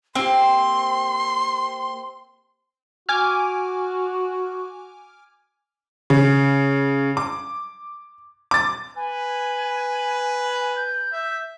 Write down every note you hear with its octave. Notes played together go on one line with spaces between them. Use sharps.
A#3 C4 G4 C6
F#4 G#5 D6 F6
C#3
D6
D6 A6
B4 G#5
G6
E5